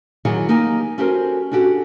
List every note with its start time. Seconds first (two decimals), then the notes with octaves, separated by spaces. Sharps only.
0.25 D#3 E3 F#3 E4 G#4 F#5
0.49 A#3 D#4 G4 G#5
0.98 C#4 F#4 G4 A4 A#4 C5
1.51 C#4 D4 F#4 G4 A4